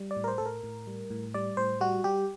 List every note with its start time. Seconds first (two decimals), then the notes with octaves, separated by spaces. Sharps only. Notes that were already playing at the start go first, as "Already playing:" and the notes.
Already playing: G3
0.11 D5
0.16 A2
0.24 A#4
0.28 C5
0.38 A2 A4
0.46 A#4
0.63 A2
0.87 G3
1.10 A2
1.34 G3 D5
1.57 A2 C5
1.81 G3 F#4
2.04 G3 G4